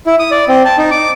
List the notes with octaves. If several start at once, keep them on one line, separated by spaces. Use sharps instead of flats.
E4
D#6
D5
C4
A5
D#4
D6